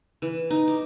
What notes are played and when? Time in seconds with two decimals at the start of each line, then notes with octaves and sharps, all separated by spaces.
0.22 E3
0.50 D#4
0.68 D6